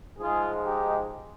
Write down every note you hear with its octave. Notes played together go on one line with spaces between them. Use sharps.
G#2 F3 G#3 F4 G#4
D#4 G4